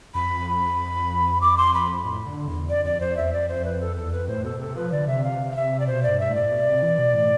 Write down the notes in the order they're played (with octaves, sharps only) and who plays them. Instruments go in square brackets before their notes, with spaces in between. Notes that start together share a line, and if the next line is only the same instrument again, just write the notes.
[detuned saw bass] F2 [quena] B5
[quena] D6
C6
B5
[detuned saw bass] A2
D3
E2
[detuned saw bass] F2 [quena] D5
[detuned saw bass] F2 [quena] D5
[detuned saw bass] F2 [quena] C5
[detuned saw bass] E2 [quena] E5
[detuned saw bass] F2 [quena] D5
[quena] C5
B4
A4
[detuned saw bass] E2 [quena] A4
[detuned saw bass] F2 [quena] B4
[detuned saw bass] A2 [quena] C5
[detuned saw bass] B2 [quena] A4
[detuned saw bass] C3 [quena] A4
[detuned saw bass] F3 [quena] B4
[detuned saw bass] D3 [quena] D5
[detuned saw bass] C3 [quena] E5
[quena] F5
F5
E5
D5
[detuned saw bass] B2 [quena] C5
[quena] D5
[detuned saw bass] G2
[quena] E5
[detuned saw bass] A2 [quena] D5
[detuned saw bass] B2
C3
E3
B2
A2